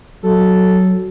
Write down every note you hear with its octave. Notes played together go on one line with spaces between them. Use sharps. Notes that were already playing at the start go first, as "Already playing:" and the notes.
F#3 A4